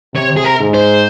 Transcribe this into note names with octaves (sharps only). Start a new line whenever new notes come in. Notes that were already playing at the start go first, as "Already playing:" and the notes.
C3 C#5
G#4
A#4
G#2
C5